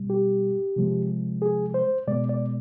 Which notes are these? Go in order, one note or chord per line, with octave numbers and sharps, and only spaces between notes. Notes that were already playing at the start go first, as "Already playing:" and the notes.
Already playing: B2 G3
G4
C3 F3 G#3
G#4
C5
B2 G#3 D5
D5